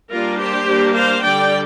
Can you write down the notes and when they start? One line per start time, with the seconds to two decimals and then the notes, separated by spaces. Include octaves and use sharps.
0.11 G3 A#3 D4 F4 A#4
0.39 G4 C5
0.67 G3 A#3 D4
0.95 C5 F5
1.24 D3 G3 D4 D5 G5